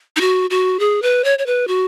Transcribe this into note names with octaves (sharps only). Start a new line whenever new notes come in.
D#4
F#4
F#4
G#4
B4
C#5
C#5
B4
F#4